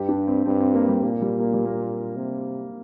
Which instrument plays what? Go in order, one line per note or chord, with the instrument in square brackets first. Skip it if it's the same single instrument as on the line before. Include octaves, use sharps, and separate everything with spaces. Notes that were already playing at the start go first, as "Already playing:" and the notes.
Already playing: [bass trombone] G2 [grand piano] G4
[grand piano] D4
C4
[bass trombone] G2 [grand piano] C4
[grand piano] C4
A#3
G3
[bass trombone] A#2 [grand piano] A#3
[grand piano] G3
A#3
G3
A#3
[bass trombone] C3